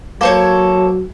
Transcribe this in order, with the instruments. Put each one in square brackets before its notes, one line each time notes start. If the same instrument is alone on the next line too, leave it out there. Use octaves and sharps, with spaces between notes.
[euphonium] F#3 [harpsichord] A#3 [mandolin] A4 C5 C#5